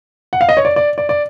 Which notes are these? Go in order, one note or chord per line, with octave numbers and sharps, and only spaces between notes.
F#5
F5
D#5
C#5
D5
D5
D5
D5